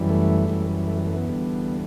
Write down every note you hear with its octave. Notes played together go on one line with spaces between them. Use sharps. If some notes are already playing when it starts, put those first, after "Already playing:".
Already playing: F#2 E3 G3
A3
F#2 E3 G3
A3
G3
A3
B3
E2 D3 G3